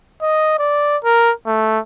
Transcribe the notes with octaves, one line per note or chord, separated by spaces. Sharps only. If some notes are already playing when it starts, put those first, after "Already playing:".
D#5
D5
A#4
A3